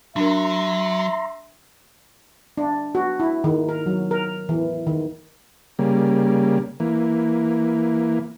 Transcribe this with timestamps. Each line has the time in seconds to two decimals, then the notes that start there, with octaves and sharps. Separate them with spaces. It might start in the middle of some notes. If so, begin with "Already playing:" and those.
0.16 F#3 D4 A#4 E5 A#5 C6
2.58 D4
2.95 F#4
3.20 E4
3.44 D#3
3.69 A#4
3.86 F#3
4.11 A#4
4.49 E3
4.87 D#3
5.79 C#3 G3 A#3
6.80 E3 A#3